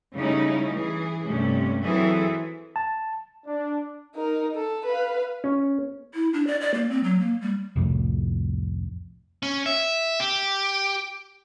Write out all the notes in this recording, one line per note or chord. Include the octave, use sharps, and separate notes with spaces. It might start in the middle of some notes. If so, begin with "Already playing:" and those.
C#3 G3 A3 C#4 D#4 E4
E3 G#4
G2 C3 A3 C#4
E3 F#3 C4 G#4 A4 E5
A5
D4
D#4 A#4
A4
B4 F5
C#4
E4
D4
D5
D5
A#3
C4
F#3
A#3
G3
C2 F2 A2
C#4
E5
G4